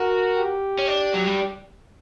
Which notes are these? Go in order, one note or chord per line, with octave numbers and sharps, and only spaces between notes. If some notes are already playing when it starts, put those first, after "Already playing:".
Already playing: F#4 A#4
G4
C#4
D4
F#3
G3